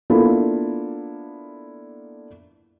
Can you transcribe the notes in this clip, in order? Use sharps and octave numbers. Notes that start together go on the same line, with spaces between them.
A#3 B3 D4 E4 F4 A4